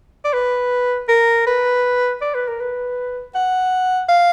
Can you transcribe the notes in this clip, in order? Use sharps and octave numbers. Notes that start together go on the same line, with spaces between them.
D5
B4
A#4
B4
D5
B4
A#4
B4
F#5
F5